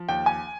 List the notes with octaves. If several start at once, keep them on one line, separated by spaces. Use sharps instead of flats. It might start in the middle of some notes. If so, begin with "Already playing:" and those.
Already playing: F3
D#2 G5
G#5